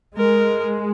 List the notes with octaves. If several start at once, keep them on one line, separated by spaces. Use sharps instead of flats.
G#3 A#4